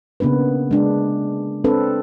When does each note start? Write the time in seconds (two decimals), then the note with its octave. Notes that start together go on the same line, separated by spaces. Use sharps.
0.20 C#3 A#3 B3 D4 B4
0.71 G#3 D4
1.64 C4 D4 A4 B4